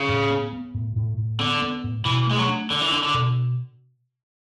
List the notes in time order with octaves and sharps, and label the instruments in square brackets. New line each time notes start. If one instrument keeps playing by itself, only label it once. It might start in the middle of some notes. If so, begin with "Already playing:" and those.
Already playing: [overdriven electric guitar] C#3
[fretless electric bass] A2
B3
B3
A2
A2
A2
[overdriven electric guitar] D3 [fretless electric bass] B3
[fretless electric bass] B3
A2
[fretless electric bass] B2 [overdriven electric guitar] E3
[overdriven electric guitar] G#3 [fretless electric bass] A3
[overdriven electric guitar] F#3
[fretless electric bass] D4
[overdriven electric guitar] D3 [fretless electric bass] D4
[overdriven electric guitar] E3
[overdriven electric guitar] D3 [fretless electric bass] D4
[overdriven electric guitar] D3
[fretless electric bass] B2